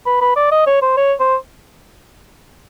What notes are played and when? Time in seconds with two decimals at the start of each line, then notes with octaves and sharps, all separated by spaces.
0.06 B4
0.21 B4
0.36 D5
0.52 D#5
0.67 C#5
0.82 C5
0.97 C#5
1.20 C5